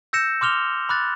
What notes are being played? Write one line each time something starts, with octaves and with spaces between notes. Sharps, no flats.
E6 G6 A#6 C#7 E7
C6 D6 F6 F7 G7
B5 D6 F#6 A6